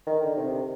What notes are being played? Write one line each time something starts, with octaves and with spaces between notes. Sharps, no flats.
D#3
D3
C3